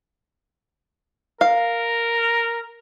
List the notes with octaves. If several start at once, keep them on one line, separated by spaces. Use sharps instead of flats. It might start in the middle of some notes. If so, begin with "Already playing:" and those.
A#4 F5